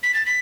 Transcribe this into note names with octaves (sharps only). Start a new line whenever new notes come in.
B6
A6
B6